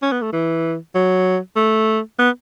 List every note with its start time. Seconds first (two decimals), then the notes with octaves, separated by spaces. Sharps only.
0.02 C#4
0.12 B3
0.22 A3
0.33 E3
0.95 F#3
1.56 A3
2.19 B3